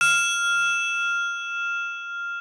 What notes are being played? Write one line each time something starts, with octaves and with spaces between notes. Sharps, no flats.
F6 E7